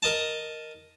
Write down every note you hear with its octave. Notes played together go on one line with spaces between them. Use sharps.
A#4 D#5 A5